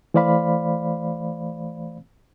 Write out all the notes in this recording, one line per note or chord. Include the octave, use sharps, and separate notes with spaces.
E3 A3 C5 D5 F5 B5